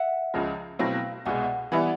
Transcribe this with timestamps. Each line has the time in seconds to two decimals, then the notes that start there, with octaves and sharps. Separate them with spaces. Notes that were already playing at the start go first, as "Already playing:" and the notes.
Already playing: E5 F#5
0.34 C#2 C#3 F3 G#3
0.79 B2 F#3 A3 C4 E4 F5 G5
1.25 C2 B2 G#3 F#5 G#5
1.72 E3 G3 B3 E4 F#5 G#5